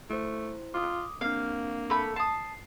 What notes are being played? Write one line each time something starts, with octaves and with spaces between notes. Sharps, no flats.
A3 E4 C5
F4 D6 D#6
A#3 C4 D4 F5
A3 B5
A5 D#6 C7